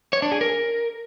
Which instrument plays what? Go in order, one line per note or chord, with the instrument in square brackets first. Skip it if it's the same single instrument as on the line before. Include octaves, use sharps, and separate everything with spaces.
[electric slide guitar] C#5
D4
G#4
A#4